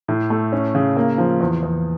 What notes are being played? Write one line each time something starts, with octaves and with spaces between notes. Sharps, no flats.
A2
A3
C#4
C#3
A#3
F3
E2
E2